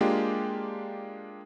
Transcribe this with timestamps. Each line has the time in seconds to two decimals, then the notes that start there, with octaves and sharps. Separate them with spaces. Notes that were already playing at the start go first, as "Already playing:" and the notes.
0.01 G#3 A#3 D4 F4 G4